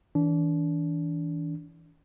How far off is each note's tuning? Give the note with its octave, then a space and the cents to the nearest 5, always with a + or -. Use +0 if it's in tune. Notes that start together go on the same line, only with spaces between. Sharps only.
E3 -30 D4 -30